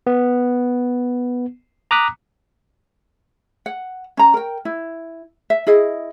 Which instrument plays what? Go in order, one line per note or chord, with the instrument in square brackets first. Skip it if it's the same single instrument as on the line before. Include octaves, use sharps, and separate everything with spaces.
[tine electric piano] B3
A#5 D6 D#6 F#6 B6
[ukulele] F#5
C#4 A#5
A#4 G5
E4
E5
E4 G#4 D#5